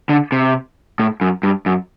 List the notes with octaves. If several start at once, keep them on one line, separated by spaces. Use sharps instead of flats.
D3
C3
A2
F#2
G2
F#2